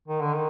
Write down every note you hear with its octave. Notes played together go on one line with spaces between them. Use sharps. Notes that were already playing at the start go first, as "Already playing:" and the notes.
D#3
D3
D#3